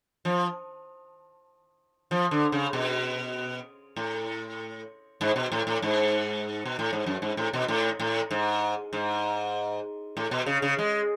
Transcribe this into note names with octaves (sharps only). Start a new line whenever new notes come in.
F3
F3
D3
C#3
B2
A2
G#2
B2
A2
A2
G#2
B2
A2
G#2
F#2
G#2
A2
B2
A2
A2
G#2
G#2
A2
B2
C#3
C#3
G#3